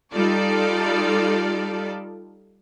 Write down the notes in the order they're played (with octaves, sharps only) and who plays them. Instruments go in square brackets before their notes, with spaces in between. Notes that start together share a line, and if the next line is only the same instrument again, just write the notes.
[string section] G3 D#4 F4 A4 D5